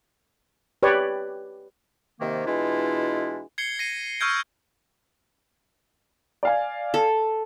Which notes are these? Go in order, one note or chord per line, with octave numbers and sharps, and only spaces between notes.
G4 B4 C#5 D5
C3 D#3 A#3
B2 E3 G#3 D4 E4 F4
G#6 C7 C#7 G7
A#6 C7 C#7 D#7
C#6 E6 F6 G6 G#6 D7
D5 F5 G#5
A4